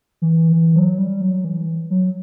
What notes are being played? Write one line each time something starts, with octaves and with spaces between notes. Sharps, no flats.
E3
E3
F#3
G3
F#3
E3
F#3